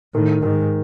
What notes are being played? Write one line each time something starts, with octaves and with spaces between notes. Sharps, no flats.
A2 D#3
G#2 D#3